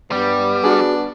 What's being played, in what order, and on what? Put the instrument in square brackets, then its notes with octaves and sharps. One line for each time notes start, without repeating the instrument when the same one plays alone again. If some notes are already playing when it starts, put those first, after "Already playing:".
[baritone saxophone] G2 [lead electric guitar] G3 [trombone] B3
[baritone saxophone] D4 [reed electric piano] F#4 G#4